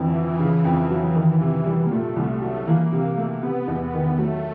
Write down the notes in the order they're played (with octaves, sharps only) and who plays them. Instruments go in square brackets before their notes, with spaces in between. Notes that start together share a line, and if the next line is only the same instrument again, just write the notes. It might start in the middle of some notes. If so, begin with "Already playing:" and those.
Already playing: [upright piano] F2 D3 [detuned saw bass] E3
[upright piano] F3
C#3
F2
F#3
D#3
C3
G3
[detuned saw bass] A#3
[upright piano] A#2 [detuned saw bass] A3
[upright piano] C2
F#3
[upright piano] E3 [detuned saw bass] A#3
[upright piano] C3
A3
[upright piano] C3 [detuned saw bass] B3
[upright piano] E2
[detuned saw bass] B3
[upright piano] D#3
[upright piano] F#3 [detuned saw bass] A3